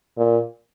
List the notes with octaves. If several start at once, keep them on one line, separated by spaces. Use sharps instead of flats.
A#2